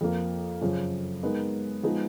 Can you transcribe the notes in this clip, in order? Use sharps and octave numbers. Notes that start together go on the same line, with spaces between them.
F2 F3 A#3
F#2 C#3 F3
G#3 B3 D#4 A#4
F3 G#3 B3 D#4 G#4